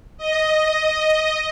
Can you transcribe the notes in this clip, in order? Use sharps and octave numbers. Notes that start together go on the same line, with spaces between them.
D#5